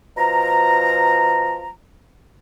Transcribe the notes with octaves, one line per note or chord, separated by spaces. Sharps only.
B2 F3 A#5